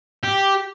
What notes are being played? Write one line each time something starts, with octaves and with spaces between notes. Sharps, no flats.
G4